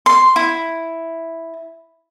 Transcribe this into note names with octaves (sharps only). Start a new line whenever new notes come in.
C6
E4